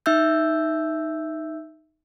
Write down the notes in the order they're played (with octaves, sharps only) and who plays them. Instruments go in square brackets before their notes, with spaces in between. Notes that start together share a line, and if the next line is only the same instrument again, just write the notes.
[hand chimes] D#4 E5 E6 G6